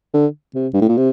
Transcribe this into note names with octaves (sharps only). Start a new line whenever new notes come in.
D3
C3
G2
A2
A#2
C3